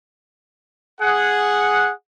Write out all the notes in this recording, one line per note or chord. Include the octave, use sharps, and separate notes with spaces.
G#4 F#5